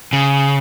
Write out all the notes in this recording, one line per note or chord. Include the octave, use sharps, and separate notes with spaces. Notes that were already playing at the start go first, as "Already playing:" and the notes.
C#3